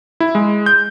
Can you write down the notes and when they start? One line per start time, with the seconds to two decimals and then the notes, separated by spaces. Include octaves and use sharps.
0.20 E4
0.35 G#3
0.66 G6